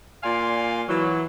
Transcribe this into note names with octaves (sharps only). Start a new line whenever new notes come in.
A#2 D5 F5 G#5 C6
E3 F#3